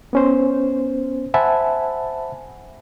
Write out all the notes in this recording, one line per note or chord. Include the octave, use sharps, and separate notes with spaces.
B3 C#4 C5
C5 E5 F#5 G#5 A5 B5